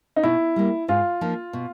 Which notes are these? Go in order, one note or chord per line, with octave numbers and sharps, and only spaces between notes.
D#4
B2 E4
G3 A#3
G#2 F4
F3 A#3 D#4
B2